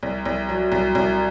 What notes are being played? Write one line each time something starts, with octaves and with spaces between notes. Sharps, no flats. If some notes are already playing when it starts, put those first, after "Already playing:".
C2
C2
F#3
C2
C2